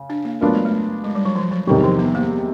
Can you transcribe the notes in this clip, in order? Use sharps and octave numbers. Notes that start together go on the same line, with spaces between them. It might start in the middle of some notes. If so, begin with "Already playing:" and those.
Already playing: C#3
D4
A#3
F#3 A3 B3 D4 F4 A#4
G#3
A3
G#3
G3
F#3
F3
F#3
E2 C3 D#3 F#3 G3
F3
B3
A#3